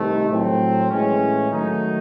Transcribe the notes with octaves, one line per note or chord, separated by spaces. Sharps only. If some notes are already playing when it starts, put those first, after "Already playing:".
Already playing: C2 C3 D#3 A3
A2 F#3 C4
A2 E3 G#3 C#4
D#3 F#3 A3 D#4